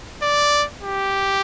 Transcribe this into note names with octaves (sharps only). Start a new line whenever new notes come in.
D5
G4